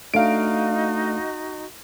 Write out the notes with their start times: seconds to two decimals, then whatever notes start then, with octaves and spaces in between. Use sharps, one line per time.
0.14 A3 D4 D#4 F#4 D#5 F5 D7